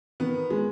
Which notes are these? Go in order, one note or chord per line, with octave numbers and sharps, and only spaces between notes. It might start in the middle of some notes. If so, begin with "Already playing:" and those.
D#3 B3
G#3